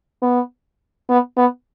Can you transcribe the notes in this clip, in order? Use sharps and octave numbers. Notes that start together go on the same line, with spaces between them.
B3
B3
B3